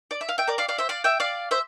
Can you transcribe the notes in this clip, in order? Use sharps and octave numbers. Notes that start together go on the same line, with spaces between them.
D5
E5
F5
E5 G5
A#4 D5
D5 F5
D5 F5
C5 E5
D5 F5
E5 G5
D5 F5
C5 E5